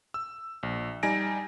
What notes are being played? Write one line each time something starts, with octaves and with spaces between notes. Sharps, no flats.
E6
A#1
G3 D#4 G#5 A#6 D7